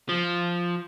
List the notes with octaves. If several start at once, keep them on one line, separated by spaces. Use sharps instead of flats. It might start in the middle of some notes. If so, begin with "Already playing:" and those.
F3